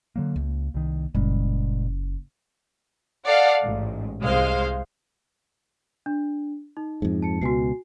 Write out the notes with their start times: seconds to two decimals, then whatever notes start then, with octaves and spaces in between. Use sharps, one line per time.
0.16 D3 F#3 A#3
0.36 C#2 A#3
0.74 C2 D#3
1.14 F#1 A#2 G3 G#3
3.26 A4 D5 F5 F#5
3.64 A1 G#2
4.21 C2 G#3 C5 F5
6.06 D4
6.77 D#4
7.02 F2 G#2
7.22 A5 C#7
7.42 C#2 B2 F#4 G#5 C7